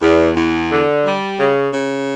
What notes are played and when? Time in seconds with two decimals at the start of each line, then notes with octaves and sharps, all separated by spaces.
0.01 E2
0.36 E2
0.70 D3
1.05 G3
1.39 C#3
1.74 C#3